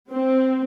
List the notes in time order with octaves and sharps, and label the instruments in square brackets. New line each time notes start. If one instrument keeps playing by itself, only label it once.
[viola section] C4